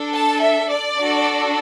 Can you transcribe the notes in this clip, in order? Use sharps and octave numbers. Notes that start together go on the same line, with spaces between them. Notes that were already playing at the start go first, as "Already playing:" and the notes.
Already playing: D4 A4
A5
E5
D5
D4 F#4 A4